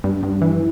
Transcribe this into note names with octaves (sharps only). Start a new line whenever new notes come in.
G2
G2
E3